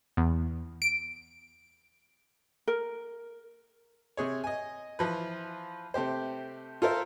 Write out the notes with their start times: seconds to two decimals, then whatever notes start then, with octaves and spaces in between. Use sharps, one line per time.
0.17 E2
0.82 D7
2.68 A#4
4.17 C3 G#4 C#5
4.44 D#5 G#5
4.99 E3 F3 B4
5.94 C3 A3 G4 C5
6.82 F4 A4 A#4 C5 E5